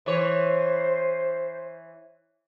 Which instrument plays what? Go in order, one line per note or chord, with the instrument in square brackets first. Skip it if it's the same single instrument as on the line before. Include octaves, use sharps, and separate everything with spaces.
[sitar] E3 C#5 [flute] C5